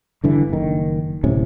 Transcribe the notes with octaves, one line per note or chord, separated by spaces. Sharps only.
G2 D3 E3
F#1 D#3
D1 A2 C3 C#4